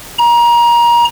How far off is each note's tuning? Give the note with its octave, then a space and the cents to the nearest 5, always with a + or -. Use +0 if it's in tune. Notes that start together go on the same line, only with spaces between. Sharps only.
A#5 +25